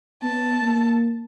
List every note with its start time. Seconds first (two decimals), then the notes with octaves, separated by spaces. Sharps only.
0.23 B3 A5
0.63 A#3